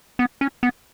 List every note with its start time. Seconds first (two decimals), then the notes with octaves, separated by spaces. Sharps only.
0.19 B3
0.41 C#4
0.63 B3